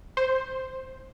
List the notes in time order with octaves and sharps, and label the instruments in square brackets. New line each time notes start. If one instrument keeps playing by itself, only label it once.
[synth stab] C5